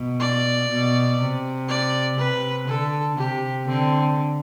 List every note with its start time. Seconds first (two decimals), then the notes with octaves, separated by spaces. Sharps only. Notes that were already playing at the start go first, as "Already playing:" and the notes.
Already playing: B2
0.20 D5
0.70 B2
1.20 C3
1.69 D5
2.18 C3 B4
2.68 D3 A4
3.18 C3 G4
3.68 D3 C4